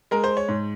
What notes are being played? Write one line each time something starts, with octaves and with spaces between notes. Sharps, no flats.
G#3 A#4
C5
C#5
G#2